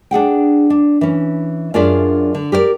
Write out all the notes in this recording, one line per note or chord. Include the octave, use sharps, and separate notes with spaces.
D4 G#4 F#5 G5
D4
E3 C#4
F#2 D4 F4 G#4 D5 E5
D3
G4 A#4 C5 D5